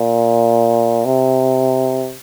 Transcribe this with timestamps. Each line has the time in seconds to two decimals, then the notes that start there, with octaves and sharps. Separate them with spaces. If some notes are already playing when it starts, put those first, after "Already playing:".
Already playing: A#2
1.05 C3